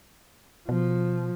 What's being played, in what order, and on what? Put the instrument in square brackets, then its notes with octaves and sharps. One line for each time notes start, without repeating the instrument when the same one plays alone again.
[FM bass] B2 [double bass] F3